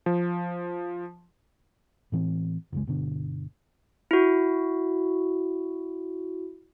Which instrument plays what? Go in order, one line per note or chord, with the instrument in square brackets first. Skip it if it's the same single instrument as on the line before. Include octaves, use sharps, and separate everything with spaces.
[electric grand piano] F3
[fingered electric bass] A2 E3 C4
F#1 C#2 G#3
G1 B2 D3
[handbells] E4 F#4